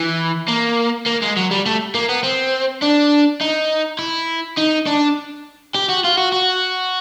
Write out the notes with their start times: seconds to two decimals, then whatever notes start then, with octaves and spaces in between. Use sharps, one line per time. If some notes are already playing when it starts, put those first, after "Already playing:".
Already playing: E3
0.48 A#3
1.07 A#3
1.22 G#3
1.37 F#3
1.51 G3
1.66 A3
1.95 A#3
2.09 B3
2.23 C4
2.82 D4
3.41 D#4
3.99 E4
4.57 D#4
4.86 D4
5.75 G4
5.89 F#4
6.04 F4
6.17 F#4
6.32 F#4